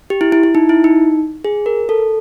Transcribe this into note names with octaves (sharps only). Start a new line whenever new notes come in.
G4
E4
E4
E4
D#4
E4
D#4
G#4
A#4
A4